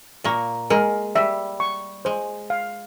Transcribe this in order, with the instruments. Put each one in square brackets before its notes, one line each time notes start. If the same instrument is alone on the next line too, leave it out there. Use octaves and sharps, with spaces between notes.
[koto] A#2 A#3 [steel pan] C#6
[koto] G#3 [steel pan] A#4
[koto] G3 [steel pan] E5
[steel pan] C#6
[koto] G#3 [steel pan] C5
[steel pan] F5